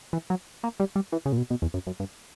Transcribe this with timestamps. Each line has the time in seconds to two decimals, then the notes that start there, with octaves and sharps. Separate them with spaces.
0.13 E3
0.30 F#3
0.64 A#3
0.80 G3
0.96 G3
1.12 E3
1.26 C#3
1.32 A#2
1.38 B2
1.50 B2
1.62 E2
1.74 F#2
1.87 F#2
2.00 G2